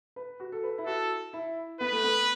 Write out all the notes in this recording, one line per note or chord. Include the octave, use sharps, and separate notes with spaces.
B4
F#4
A4
B4
E4
F#4 A4
E4
B3 B4
A3
B3